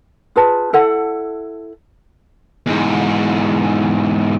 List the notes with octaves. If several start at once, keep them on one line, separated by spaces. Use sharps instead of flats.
F4 G#4 B4 A5
E4 A4 F#5
E2 G#2